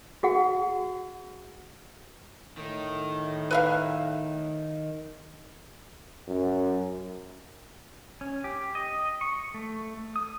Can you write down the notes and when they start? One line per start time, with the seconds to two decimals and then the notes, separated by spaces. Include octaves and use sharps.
0.23 F#4 G#4 F#5
2.57 A2 D#3
3.51 B4 E5 F5
6.27 F#2
8.21 C#4
8.44 G4
8.75 D#5
9.21 C#6
9.54 A3
10.16 D#6